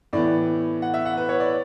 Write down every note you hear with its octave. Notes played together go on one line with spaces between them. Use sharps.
A2 E3 B3 D5
F#5
E5
F#5
B4
C#5
D5